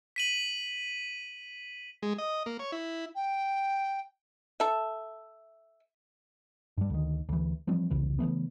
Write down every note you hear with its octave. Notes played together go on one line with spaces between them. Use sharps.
B6 D#7 F#7
G#3
D#5
A#3
C#5
E4
G5
A4 E5
G2 G3
D2 D#3
D2 E3
E3 F3 G3 C4
E1 C2 C#3 E3
C#3 E3 A3 B3